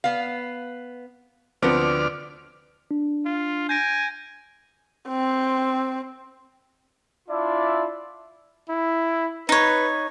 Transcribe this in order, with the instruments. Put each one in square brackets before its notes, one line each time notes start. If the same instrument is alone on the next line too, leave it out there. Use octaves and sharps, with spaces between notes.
[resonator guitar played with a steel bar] B3 F5
[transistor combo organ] D2 D5 F6 [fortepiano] F3 B3 [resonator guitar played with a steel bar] C4
[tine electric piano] D4
[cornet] F4
[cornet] G#5 [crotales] G6 A#6 D7
[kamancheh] C4
[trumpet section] D4 E4 F4 D5 E5
[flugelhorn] E4
[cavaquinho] D#4 C#5 [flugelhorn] B4